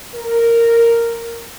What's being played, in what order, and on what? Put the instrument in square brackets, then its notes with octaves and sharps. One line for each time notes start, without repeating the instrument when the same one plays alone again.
[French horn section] A#4